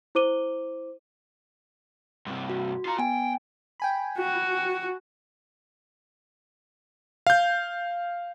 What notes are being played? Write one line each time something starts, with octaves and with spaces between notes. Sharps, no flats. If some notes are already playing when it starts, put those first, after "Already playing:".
E4 C5 D6 D#7 G7
G2 C3
F#4
F4 A#5
B3 G5 G#5
G5 G#5 B5
F#4
F5 G6